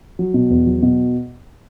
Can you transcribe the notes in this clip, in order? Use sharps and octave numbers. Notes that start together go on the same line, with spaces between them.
F#3
B2
E2
F#3
B2